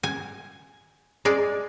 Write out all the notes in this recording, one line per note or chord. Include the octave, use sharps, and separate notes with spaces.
G#5
G#3 D5